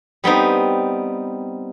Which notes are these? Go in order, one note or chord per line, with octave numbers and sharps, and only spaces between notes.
G3 B3 C4 D#4